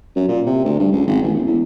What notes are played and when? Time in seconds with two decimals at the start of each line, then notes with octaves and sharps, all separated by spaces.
0.16 F#2
0.28 A#2
0.46 C3
0.65 D2
0.79 G2
0.92 C#2
1.07 G#1
1.22 A1
1.34 E1
1.47 E2